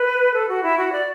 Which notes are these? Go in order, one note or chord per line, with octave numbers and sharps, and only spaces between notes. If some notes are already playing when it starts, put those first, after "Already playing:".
Already playing: B4
A4
F#4
E4
F#4
D5